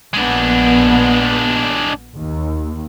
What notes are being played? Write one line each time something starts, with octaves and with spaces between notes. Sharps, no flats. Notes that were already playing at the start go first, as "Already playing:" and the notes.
A#1 G#3 B3 D4
D#2